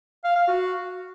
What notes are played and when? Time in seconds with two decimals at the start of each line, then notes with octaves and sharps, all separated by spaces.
0.24 F5
0.36 F5
0.48 F#4